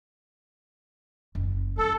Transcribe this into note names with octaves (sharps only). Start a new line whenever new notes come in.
F#1
G3 A4